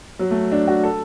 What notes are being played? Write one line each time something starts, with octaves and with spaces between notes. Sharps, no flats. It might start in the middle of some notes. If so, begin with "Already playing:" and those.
F#3
A3
D4
F#4
A4